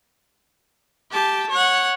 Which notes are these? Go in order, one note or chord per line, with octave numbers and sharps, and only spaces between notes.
G4 A5
C#5 F#5